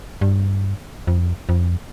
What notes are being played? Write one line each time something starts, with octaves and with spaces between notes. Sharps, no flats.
G2
F2
F2